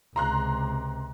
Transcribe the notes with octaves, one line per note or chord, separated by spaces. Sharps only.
C#2 C3 A#5 C6 F#6